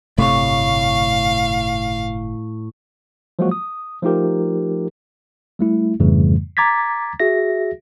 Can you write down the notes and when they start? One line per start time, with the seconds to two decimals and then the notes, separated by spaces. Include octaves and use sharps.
0.18 G1 A2 C3 A3 C#5 F5
3.39 F3 F#3 G#3 A#3 F4 F#4
3.51 D#6
4.02 F3 A3 D#4 F4 G4 A#4
5.59 G3 A3 E4
6.00 F2 G#2 C#3 E3 G3 A3
6.57 A#5 D6 G#6 A6 B6
7.20 F#4 G#4 E5 A#6